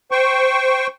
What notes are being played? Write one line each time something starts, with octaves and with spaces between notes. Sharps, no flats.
C5 G5 C#6